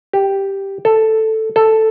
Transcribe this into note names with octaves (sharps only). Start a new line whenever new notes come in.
G4
A4
A4